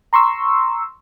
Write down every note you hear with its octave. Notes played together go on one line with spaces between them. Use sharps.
A#5 C6 C#6 E6